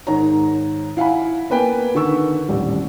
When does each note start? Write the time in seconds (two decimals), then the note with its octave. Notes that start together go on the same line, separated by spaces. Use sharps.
0.07 G#2 D#3 C#5 A#5
0.97 E4 F5 F#5 G#5 B5
1.50 A#3 B3 B4 G5 G#5
1.95 D3 D#3 C#6 E6
2.48 D#1 A1 G3